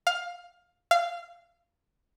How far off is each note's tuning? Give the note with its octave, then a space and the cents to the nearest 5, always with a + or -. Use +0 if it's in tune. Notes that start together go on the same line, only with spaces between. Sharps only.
F5 +15
F5 -15